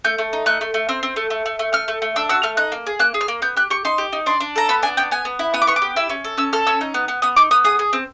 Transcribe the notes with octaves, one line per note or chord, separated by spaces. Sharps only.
A3 G6
A3
D#4
A3 F#6
A3
A3
C4 F6
C4
A3
A3
A3
A3
A3 F6
A3
A3
D4 E6
F#4 E6
A3 F6
D#4 F#6
A#3
G#4
A#3 F#6
G#4
F6
A#3
B3 G6
G4 F#6
G4 C#6
D#4 C6
G4
D#4
D4 C6
D4
A4 A#5
B3 B5
D4 G#5
B3 G5
B3 G#5
B3
E4
B3 D#6
D6
B3 C#6
D6
G4
E4 E6
C#4
A4
C#4 E6
A4 F6
C#4 E6
D#4
B3
B3
B3 D#6
D#4 D6
B3 D#6
G#4 D#6
G#4
C4